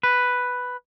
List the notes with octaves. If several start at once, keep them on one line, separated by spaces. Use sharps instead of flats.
B4